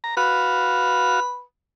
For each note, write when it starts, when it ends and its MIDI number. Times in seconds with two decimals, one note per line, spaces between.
0.04 0.15 82
0.17 1.20 66
0.17 1.43 71
0.17 1.20 77